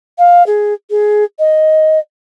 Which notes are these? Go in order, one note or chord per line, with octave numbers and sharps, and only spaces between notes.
F5
G#4
G#4
D#5